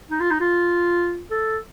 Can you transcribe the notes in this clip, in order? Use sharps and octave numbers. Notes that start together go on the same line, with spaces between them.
D#4
F4
D#4
F4
A4